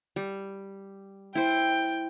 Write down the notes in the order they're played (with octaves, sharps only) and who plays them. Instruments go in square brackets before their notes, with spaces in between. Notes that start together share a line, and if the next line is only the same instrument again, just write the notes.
[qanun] G3
[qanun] E4 C5 [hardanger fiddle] G5